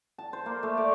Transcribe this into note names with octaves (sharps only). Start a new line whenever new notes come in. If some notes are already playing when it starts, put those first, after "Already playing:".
A5
C5
A#3
A3
D5